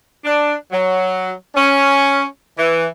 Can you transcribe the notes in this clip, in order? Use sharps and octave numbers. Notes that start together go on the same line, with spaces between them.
D4
F#3
C#4
E3